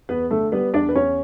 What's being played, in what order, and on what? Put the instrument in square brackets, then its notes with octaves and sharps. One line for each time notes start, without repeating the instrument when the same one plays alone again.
[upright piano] E2 B3 B4
D3 A3 A4
G3 B3 B4
E2 D4 D5
B4
E2 C#4 C#5